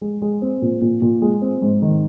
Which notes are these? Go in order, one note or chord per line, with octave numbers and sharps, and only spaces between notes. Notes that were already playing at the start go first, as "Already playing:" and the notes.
G#3
G#3
C4
A#2
A#2
A#2
G#3
C4
G#2
D#3